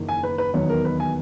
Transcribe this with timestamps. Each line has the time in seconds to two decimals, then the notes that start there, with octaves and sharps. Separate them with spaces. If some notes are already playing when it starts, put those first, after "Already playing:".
Already playing: F#1 E2 D#3 A#3
0.08 G#5
0.23 B4
0.38 B4
0.54 E1 D#2 D#3 F#3 B3 C#5
0.70 A#4
0.85 B4
1.00 G#5